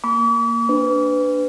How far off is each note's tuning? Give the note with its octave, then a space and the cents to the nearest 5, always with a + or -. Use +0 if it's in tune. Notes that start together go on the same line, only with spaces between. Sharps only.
A#3 +0 B5 -20 D6 -45
D4 +0 B4 +25